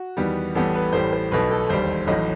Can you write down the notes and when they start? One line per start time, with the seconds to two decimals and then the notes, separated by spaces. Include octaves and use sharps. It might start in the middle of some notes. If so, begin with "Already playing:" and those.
Already playing: F#4
0.17 E2 D#3 G3 B3
0.55 A1 A2 G3 B3 A4
0.75 B4
0.93 A1 A2 G3 C5
1.13 C5
1.32 B1 B2 A3 B4
1.51 A4
1.69 E1 D#2 D#3 G3 C5
2.07 A1 A2 F#3 D#5